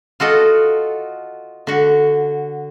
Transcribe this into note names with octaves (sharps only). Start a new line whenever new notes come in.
F4 F#4 A4 D#5
D3 F#4